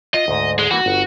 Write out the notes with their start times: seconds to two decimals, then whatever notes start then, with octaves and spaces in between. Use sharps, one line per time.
0.14 F4 D#5
0.28 D2 G#2
0.59 G#3
0.71 E3 A#3 F#4
0.86 G1